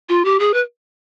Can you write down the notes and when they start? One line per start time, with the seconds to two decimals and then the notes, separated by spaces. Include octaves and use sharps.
0.09 F4
0.25 G4
0.40 G#4
0.54 B4